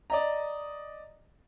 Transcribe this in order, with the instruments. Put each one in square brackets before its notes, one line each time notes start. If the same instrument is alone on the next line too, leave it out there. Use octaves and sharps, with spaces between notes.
[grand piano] D5 D#5 A#5